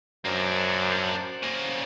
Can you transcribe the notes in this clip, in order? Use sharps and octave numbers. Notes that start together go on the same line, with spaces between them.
F#2 A#3 D4 C5 D5 F#5
C#3 A#3